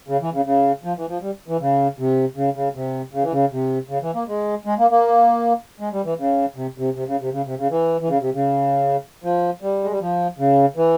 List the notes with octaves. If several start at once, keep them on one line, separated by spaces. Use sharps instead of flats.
C#3
E3
C#3
C#3
F3
E3
F3
G3
E3
C#3
C3
C#3
C#3
C3
C#3
E3
C#3
C3
C#3
E3
A#3
G#3
G#3
A#3
A#3
G#3
G3
E3
C#3
C3
C3
C3
C#3
C3
C#3
C3
C#3
E3
E3
C#3
C3
C#3
F3
G3
G#3
G3
F3
C#3
E3